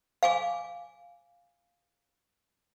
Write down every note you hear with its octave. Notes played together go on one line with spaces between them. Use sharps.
F5 G#5 D6